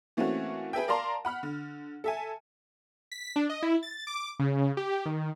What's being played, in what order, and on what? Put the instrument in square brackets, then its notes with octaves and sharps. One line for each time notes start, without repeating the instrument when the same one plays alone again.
[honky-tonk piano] E3 A3 A#3 C4 C#4 F#4
G#4 B4 E5 G5
A#4 D5 F5 A5 A#5 C6
F#5 B5 F6
D3
A4 E5 G#5
[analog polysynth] B6
D4
D#5
E4
A6
D6
C#3
G4
D#3